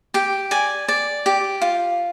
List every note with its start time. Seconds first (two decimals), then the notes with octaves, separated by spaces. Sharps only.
0.14 G4 G5
0.51 D5 G#5
0.88 D5
1.26 G4
1.62 F4